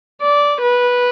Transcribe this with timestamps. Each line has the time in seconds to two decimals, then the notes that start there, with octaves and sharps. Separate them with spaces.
0.22 D5
0.62 B4